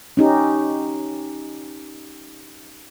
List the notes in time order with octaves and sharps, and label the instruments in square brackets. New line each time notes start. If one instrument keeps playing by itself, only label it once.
[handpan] C#4 D#4 G4